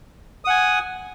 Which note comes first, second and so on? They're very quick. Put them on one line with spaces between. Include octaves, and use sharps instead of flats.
D#6 F#5 G#5